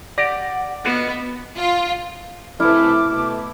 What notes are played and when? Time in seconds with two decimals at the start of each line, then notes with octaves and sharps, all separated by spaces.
0.18 G4 D5 F#5 A#6
0.84 B3 D4 F4 F#4 D#5
1.57 F4
2.60 C3 E3 A3 E4 B4 D6 F6
3.09 B2 A3